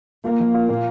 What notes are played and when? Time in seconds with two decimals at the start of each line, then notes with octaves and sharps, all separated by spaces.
0.24 A#3 F4
0.40 F3
0.54 F4
0.69 A#2